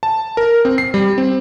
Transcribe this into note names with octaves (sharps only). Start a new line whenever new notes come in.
A5
A#4
C4
C7
G3
C4